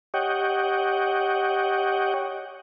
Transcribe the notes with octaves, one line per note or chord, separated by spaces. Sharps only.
G4 C#5 D#5 F#5 G5